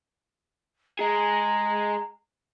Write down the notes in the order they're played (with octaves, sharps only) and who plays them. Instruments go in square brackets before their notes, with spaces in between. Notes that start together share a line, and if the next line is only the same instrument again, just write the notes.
[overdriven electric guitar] G#3 G#4 [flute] A#5